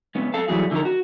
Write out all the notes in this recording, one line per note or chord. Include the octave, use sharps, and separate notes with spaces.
G#3 B3 C#4
A4 F5 A5
E3 F#3 G3 A3 F#4 G#4
D3 F3 D#4 G4 A#4
F#4